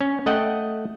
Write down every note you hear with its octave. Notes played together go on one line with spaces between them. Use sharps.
C#4
A3 D#5 F#5 G5